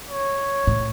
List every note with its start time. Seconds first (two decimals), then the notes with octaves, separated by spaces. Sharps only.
0.08 C#5
0.67 A2